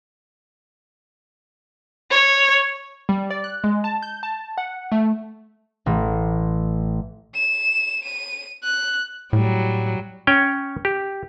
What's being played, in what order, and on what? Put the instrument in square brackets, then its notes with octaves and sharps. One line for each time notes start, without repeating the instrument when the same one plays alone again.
[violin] C#5
[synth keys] G3
D5
F#6
G#3
A5
G6
A5
F#5
A3
[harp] A1
[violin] E7
D#7
F#6
[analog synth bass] A2 [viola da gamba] F#3 G3
[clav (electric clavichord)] C#4 C#5 G5
G4